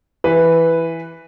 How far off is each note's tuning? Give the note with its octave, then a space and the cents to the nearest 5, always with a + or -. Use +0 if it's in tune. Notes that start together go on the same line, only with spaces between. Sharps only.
E3 +0 B4 +0